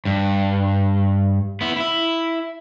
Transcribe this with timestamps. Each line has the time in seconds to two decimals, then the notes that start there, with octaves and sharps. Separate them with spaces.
0.05 G2
1.61 B3 E4
1.76 E4 E5